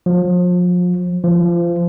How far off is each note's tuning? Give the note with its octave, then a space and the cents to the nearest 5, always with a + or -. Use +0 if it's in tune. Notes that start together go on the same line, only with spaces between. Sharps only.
F3 +35
F3 -25